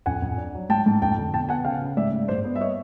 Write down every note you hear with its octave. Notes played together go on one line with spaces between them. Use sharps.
F2 F#5 G#5
F2
D4
F#3
G#2 G5 A5
G#2
F2 G5 A5
D3
B2 G5 A5
B3 F#5 G#5
C#3 F5 G5
C#3
G#2 D5 E5
G#2
G2 C5 D5
B3
E5
A#3 C#5 D#5